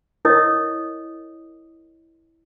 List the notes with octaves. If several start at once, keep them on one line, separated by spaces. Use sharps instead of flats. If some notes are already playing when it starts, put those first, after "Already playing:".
E4 A#4 C#5 D#5 D#6